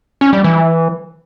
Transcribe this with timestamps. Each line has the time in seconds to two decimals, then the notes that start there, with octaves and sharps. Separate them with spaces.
0.21 C#4
0.33 G3
0.44 E3